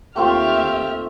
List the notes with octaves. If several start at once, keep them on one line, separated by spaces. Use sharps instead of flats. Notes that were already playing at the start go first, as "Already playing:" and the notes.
D#2 A3 C4 F4 G4 E5 F6